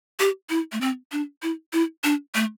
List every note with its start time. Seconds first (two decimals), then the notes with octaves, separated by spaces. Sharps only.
0.19 G4
0.49 E4
0.72 A3
0.81 C4
1.12 D4
1.42 E4
1.73 E4
2.04 D4
2.35 A3